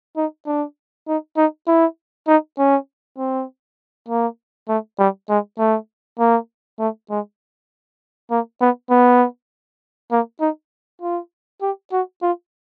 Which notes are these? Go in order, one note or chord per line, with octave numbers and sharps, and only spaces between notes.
D#4
D4
D#4
D#4
E4
D#4
C#4
C4
A#3
A3
G3
G#3
A3
A#3
A3
G#3
A#3
B3
B3
A#3
D#4
F4
G4
F#4
F4